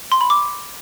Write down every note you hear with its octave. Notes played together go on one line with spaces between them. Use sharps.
C6
B5
D6